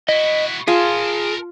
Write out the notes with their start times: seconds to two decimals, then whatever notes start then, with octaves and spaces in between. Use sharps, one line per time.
0.09 E4 F#4 D#5
0.68 F4 G#4 A#4 A5